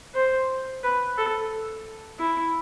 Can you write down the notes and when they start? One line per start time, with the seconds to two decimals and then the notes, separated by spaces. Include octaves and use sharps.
0.15 C5
0.83 B4
1.18 A4
2.20 E4